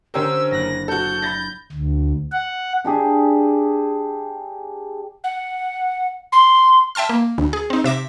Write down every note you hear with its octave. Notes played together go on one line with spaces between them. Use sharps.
D3 C#4 G4 A#4 C5 E6
F#1 F#6 A#6
F#4 A4 G6
B5 A6 A#6
D2
F#5
D4 G4 G#4
F#5
C6
E5 G5 A5 C6 F6
A#3
D2
G#4
C4 D#4
C3 E5 D6 A#6